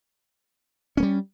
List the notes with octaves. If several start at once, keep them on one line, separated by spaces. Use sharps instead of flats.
G3 A#3 C#4